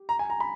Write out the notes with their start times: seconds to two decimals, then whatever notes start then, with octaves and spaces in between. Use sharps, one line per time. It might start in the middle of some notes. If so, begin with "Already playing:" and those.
Already playing: G4
0.09 A#5
0.19 G#5
0.30 A#5
0.40 B5